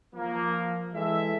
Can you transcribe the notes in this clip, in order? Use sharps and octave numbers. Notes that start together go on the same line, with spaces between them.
F3 A#3
E3 G#3 A4 E5